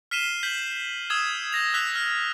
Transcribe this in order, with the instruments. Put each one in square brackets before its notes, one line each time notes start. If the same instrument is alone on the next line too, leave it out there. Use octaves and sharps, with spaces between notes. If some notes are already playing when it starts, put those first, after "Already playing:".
[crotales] F6 B6 C7 D#7 E7 G7
G6 B6 F#7
D#6 E6 G#6 E7
G6 A#6 F7
E6 F#6 B6 F7
F6